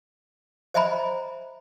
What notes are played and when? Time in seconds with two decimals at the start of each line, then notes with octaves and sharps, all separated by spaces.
0.74 C5 D#5 E5 G#5 A#5 B5